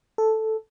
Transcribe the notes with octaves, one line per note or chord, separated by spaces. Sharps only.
A4